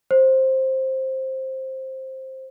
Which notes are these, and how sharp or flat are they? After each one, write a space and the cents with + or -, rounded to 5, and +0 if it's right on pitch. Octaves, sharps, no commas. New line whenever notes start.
C5 +10